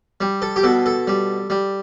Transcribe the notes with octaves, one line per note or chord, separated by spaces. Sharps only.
G3
A4
G4
B2 A4
A4
G3
G3